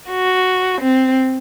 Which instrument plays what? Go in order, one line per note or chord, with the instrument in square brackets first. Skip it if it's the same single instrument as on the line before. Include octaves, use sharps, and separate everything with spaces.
[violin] F#4
C4